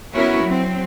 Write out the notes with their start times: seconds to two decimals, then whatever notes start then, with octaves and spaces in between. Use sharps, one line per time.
0.14 B3 C#4 E4 F#4 A#4 C#5
0.43 F#3 C4